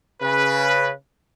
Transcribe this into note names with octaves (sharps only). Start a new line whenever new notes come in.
C#3 B4